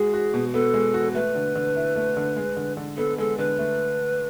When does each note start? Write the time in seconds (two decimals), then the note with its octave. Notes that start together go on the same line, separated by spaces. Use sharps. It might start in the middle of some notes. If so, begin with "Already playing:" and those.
Already playing: G#3 F#4 G#4
0.13 F#4
0.34 B2
0.53 B3 A4
0.74 G#3
0.94 F#4
1.15 A3 B4
1.35 D3
1.55 D3
1.76 E4
1.96 A3
2.17 D3
2.36 G#3
2.57 D3
2.77 D3
2.97 B3 A4
3.18 G#3 A4
3.38 D3 B4
3.59 A3